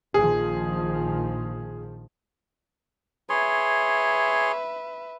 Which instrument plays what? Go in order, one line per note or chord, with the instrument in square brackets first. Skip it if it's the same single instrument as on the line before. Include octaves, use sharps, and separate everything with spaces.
[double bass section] A#1 D#3 F3 [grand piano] G#4
[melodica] G#4 C#5 C6 [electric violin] B4 E5